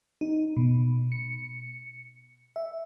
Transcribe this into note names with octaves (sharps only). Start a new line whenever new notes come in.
D#4
B2
C#7
E5